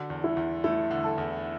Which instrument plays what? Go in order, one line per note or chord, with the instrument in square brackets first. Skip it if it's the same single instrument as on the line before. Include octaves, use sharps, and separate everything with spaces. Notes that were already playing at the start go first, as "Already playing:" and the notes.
Already playing: [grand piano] D3 [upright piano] F#4
[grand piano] E2
[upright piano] E4
[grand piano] E2
[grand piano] A3 [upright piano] E4
[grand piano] D3
[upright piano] A4
[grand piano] E2